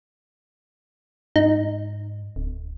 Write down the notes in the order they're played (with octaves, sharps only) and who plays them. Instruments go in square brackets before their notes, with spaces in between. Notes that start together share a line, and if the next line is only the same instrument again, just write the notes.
[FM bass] G#2 [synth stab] D#4
[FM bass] D1